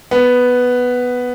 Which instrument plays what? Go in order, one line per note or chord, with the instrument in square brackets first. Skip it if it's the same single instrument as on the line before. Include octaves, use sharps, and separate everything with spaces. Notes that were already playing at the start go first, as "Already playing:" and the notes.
[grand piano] B3